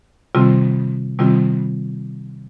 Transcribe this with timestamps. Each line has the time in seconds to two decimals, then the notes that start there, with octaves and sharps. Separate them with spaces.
0.35 C3 D#3 G3 C4 F4
1.19 C3 D#3 G3 C4 F4